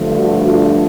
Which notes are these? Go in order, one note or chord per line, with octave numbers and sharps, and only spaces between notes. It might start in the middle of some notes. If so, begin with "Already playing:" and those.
Already playing: G2 D3 F3 A3
F#4
F4